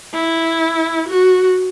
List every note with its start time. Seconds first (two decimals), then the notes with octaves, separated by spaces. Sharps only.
0.14 E4
1.08 F#4